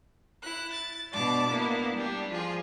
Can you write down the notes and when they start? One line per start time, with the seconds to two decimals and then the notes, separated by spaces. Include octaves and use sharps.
0.42 E4 F#6
0.73 A6
1.12 B2 D4 D5 A5 D6
1.49 A#3 B3 D4 E4
1.96 G3 D4 G4
2.30 F3 F4 G#4